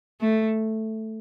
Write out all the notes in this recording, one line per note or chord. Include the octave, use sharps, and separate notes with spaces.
A3